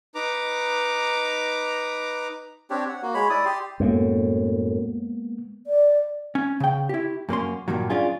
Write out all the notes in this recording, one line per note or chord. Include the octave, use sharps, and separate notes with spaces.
D#4 B4 A#5 D6
C4 D4 G4 C#5
F#5
A#3 F#4
G#3 C#5 B5
E4 D5 D#6
G4 C6
F#2 A2 G#3 A#3 B3
D5
C#4
C#3 G5
E4 G4
F#2 A#3 C#4 C6
G2 A#2 D#3 F#3
C#4 D4 F4 G#4